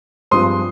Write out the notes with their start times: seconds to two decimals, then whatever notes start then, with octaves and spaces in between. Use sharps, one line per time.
0.31 G2 F3 G#3 C4 C6 D#6